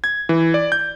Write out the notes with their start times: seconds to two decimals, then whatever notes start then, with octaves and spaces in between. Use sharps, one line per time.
0.04 G#6
0.29 E3
0.54 D5
0.72 G6